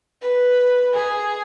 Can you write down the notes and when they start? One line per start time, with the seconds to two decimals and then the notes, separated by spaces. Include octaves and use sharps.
0.21 B4
0.93 G#4